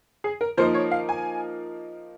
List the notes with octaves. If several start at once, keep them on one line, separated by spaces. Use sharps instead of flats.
G#4
A#4
F3 A#3 D#4 C5
C#5
F5
G#5